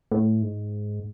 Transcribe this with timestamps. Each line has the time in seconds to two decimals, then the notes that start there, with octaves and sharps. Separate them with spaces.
0.12 A2
0.42 G#2